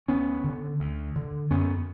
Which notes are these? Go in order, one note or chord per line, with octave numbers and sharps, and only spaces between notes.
D2 B3 C#4
D3
D2
D3
F#2 B3 C#4